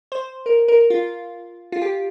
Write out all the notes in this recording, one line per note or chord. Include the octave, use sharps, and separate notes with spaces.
C5
A#4
A#4
F4
F4
G4